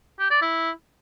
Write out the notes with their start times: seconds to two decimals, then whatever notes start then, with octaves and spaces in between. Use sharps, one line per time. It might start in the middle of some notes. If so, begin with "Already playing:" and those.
0.19 G4
0.30 D5
0.42 E4